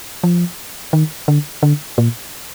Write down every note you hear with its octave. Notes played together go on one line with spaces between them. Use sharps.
F3
D#3
D3
D3
A#2